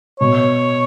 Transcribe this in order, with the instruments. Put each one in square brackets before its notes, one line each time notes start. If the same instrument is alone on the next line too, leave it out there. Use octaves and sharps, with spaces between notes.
[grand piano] B2 [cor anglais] C#5